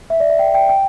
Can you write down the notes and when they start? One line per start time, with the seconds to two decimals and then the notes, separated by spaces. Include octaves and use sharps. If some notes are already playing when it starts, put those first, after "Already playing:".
0.10 E5
0.20 D5
0.30 E5
0.39 G5
0.54 G5
0.69 G5